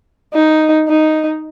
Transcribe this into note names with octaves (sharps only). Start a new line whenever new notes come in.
D#4
D#4